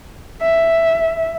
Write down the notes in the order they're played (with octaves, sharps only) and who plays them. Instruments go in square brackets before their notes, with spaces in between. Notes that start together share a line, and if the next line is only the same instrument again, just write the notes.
[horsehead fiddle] E5